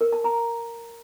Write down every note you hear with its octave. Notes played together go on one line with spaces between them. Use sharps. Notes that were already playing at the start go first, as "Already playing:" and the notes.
A#4
A5
A#5